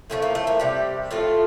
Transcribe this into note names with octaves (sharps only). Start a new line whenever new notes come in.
A2 F3 A3 C4
A#3
A3
A#3
C3 G3 G4
A2 F3 A3 F4